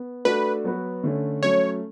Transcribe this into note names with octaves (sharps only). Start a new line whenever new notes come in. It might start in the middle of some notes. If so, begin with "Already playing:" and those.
Already playing: B3
A3 D4 F#4 A4 B4
F#3 B3 F#4 B4
D3 A3 C#4
F#3 A3 C#4 C#5